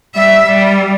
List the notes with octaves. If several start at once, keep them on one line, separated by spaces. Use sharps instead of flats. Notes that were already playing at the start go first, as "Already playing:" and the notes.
G3 E5
G3